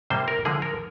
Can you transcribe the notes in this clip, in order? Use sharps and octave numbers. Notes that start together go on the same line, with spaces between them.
C3 G3 A#3 C5
A#4
D3 F3 G#3 G#4
A#4